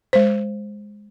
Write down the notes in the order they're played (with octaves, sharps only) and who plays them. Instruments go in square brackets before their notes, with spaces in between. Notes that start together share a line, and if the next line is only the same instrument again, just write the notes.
[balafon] G#3 C5